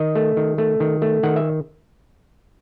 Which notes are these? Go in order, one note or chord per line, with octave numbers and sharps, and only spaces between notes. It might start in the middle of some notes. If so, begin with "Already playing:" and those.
Already playing: D#3 D#5
A3
D#3
A3
D#3
A3
D#3 F#5
E5